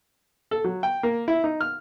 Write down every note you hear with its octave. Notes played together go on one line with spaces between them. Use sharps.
A4
F#3
G5
A#3
E4
D#4
F6